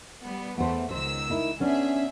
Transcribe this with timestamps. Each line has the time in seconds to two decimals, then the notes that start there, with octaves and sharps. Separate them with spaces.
0.23 G3 B3
0.58 E2 E3 A3 B3 C5
0.91 C#2 D#3 C5 E6
1.30 D#4 E4 A#4
1.60 B3 C#4 D4 G#4 E5